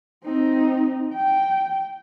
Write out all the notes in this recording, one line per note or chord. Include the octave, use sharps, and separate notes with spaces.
C4 D#4
G5